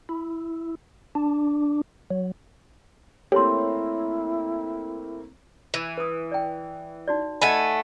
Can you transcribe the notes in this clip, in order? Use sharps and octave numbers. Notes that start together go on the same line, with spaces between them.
E4
D4
F#3
A3 A#3 C4 E4 G4 C#5 C6
E3
B4 D#6
D5 G5
D#4 F#4 D5
A3 D#5 F#5 G#5 B5